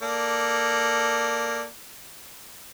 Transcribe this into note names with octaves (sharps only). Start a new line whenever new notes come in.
A#3 A4 D5